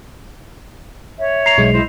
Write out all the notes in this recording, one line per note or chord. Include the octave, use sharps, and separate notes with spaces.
C#5 E5
A#5 C7 F7
B1 G#3
E4 C5 D#5